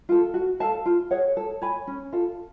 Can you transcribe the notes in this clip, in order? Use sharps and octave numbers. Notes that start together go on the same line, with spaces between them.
F4 A4
F#4
A4 F5 A5
F4
G#4 C#5 F#5
A4
C#5 G#5 B5
C#4
F4 A4